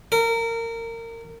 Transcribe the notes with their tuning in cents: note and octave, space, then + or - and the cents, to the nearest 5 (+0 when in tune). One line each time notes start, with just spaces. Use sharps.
A#4 -25